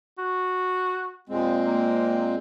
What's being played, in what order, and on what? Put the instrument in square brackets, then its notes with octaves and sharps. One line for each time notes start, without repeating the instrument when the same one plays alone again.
[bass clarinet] F#4
[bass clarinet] D#2 [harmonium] A#2 G#3 C4
[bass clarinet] A#3